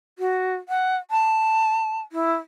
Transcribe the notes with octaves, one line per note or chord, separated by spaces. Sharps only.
F#4
F#5
A5
E4